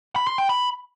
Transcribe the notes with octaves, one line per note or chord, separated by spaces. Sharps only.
B5
C6
G5
B5